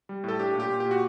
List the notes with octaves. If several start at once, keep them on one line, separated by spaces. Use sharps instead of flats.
G3
A2 A4
D4 G4
A#2 G4
A#2
G4
A#2
F#4